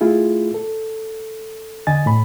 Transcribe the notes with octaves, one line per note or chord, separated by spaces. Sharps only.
A3 E4 F4 G#4
A4
E2 D3 D#5 G#5 A6
A2 B5